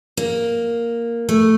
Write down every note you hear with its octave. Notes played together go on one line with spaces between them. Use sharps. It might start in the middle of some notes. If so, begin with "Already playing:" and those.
A#3
A3